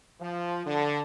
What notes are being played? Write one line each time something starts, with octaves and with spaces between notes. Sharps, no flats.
F3
D3